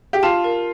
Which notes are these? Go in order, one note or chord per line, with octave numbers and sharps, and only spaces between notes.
G4
F4 A5
A#4